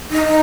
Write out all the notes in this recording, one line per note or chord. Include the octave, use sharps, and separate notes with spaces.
D#4